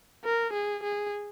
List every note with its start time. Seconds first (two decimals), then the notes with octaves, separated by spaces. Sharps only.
0.25 A#4
0.54 G#4
0.84 G#4